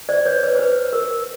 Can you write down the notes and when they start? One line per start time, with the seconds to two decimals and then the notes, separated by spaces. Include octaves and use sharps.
0.09 C5 D5
0.26 B4 C#5
0.43 B4
0.55 C5
0.59 B4
0.93 A#4